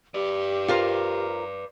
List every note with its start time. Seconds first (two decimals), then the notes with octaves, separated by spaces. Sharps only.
0.14 G4 B4 D5
0.68 F4 A#4 C5